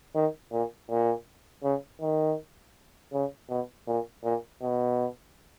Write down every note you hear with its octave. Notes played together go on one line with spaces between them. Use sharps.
D#3
A#2
A#2
C#3
D#3
C#3
B2
A#2
A#2
B2